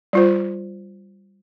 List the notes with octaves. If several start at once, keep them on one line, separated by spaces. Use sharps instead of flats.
G3 F4 C5